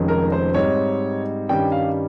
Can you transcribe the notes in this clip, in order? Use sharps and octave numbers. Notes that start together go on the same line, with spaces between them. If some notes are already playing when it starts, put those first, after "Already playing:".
Already playing: F1 F2 D#3 G#3 C#4
A#4
C5
G#2 G3 C4 D#4 C#5
G2 D#3 G3 C#4 G5
F5